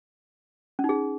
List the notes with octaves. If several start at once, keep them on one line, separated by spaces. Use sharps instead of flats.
C#4
D#4
G#4